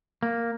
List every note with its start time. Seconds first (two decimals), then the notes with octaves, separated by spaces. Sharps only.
0.23 A#3